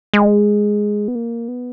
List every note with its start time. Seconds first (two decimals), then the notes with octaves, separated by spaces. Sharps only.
0.13 G#3
1.08 B3
1.15 A#3
1.48 B3